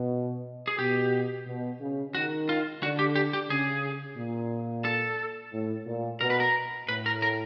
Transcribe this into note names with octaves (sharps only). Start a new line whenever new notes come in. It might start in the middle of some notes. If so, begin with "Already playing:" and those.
Already playing: B2
G#4
B2 G4
B2
C#3
D#3 F#4
F4
D3 F#4
G4
G4
G4
C#3 G#4
A#2
A4
A2
A#2
B2 A#4
B4
A#4
A2 B4
A#4
A#4